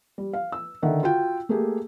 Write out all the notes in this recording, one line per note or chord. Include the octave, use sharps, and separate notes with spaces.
G3
F5
E6
D3 D#3 E5 F#5
F4 F#4 G5
A3 A#3 G4 G#4